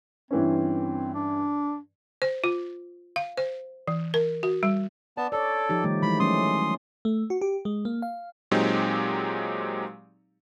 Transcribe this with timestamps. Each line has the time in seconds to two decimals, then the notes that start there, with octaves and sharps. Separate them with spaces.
0.31 G2 E3 C4 C#4
1.14 D4
2.22 C5
2.44 F4
3.16 F5
3.37 C5
3.88 E3
4.14 A#4
4.43 F#4
4.63 G3
5.17 B3 D5 A5
5.32 A4 C#5 D5
5.69 F3 D#4 G4
5.84 D#3 G3 A3
6.02 E3 G#3 E4 B5
6.20 F#3 A3 C#4 C6 D#6
7.05 A3
7.30 F#4
7.41 G4
7.65 G#3
7.85 A#3
8.02 F5
8.51 A#2 F#3 G#3 C4 D#4 G4